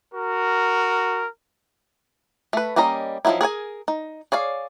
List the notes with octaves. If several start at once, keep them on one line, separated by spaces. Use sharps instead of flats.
F#4 A#4
A3 B4
G3 A#3 C#4 D#5 A#5
F3 F#3 B3 D#4 E4
G#4 A#4 C#5 G#5
D#4
G#4 C#5 D5 F5